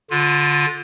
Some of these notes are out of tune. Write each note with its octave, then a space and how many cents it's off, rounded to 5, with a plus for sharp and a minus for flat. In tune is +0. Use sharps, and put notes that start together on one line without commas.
D3 -10 F4 +15